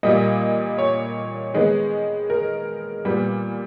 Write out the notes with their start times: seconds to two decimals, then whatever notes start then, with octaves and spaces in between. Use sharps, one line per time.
0.03 A#2 G3 A#3 D#5
0.78 C#5
1.54 D#3 G#3 B3
2.30 A#4
3.05 A#2 G3 B3